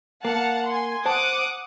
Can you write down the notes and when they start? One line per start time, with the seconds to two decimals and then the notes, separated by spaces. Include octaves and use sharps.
0.25 A#3 F5 F#5 A5
0.68 G#5 C6
1.06 C5 F#5 A5 D6 D#6